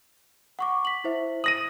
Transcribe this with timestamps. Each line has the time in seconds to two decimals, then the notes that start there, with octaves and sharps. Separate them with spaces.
0.59 F#5 C#6 D6
0.85 B6 F#7
1.04 E4 C5 E5
1.44 D#6 A#6 D#7 F#7